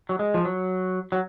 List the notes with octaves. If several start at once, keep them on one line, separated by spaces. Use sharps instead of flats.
F#3
G#3
F3
F#3
F#3